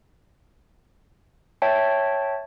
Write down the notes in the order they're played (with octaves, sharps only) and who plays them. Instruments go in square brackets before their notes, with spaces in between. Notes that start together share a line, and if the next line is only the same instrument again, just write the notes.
[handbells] C#5 E5 G5 A5